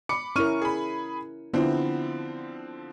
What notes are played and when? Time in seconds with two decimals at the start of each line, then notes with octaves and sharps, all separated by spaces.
0.09 B5 D6 C#7
0.36 C#4 E4 A#4 C#6 F6 D#7
0.62 G#4 B5
1.54 D3 F3 B3 C4 E4